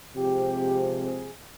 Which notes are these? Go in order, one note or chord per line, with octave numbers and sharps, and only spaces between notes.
C3 F3 G#3 C4 G4
G#4